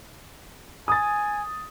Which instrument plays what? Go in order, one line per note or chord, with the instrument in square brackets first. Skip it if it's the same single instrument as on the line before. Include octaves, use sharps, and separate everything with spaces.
[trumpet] G#5 [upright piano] D#6 A6